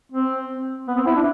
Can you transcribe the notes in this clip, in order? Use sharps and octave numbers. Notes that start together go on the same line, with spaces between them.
C4
B3
C4
E4
D4